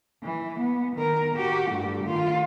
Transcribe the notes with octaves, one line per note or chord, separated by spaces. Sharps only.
E3
B3
D#3 A#4
F#4 G4
G2 A3
D#3 F4